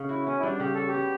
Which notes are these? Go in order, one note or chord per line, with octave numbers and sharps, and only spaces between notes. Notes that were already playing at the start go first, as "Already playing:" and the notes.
Already playing: C#3
E4 F#4
B3 C#4
E4
G3 D4
C#3 G4
F#4 A4
G4
B3